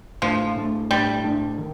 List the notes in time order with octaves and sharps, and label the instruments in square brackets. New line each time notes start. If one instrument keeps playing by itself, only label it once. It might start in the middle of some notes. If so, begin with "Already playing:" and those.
[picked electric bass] A2 A3 D4 [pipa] F3
[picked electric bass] A2 A3 D4
[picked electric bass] A2 A3 D4 [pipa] G3
[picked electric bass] A2 A3 D4
D#3